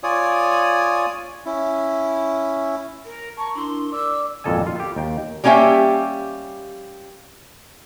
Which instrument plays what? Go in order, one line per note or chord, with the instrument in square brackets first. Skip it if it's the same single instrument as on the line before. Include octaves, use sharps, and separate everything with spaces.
[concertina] F4 C#5 D5 G#5 D#6
C#4 E4
[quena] A#4
[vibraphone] A5 A#5 [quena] C#6
[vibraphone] D4 E4 A#4 [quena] C6
[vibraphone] D5 D6 [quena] E6
[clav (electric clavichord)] G#1 F2 A#2 A4 D#5 G#5
F4
G4
D#2 G5
[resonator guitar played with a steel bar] G3 A#3 C#4 G4 E5 G5